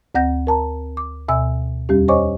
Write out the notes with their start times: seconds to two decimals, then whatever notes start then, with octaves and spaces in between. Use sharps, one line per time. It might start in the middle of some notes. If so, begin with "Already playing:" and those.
0.15 D2 C4 F#5 G6 A#6
0.47 A#4 A5 A#5
0.97 D6
1.28 D2 B2 E5 G#5 E6
1.89 E2 G3 C#4 G4
2.08 C5 C#5 D#5 G#5 C#6 D6